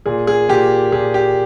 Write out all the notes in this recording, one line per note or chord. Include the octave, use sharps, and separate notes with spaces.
A#2 G#4
G#4
A#2 G4
A#2 G#4
G4